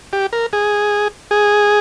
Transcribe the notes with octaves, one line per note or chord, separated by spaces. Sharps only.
G4
A#4
G#4
G#4